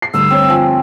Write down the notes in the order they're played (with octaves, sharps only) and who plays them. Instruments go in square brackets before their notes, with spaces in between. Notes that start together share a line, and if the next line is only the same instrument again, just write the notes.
[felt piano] C7
[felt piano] D2 G2 [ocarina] E6
[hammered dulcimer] C4 C#5
F3 G#5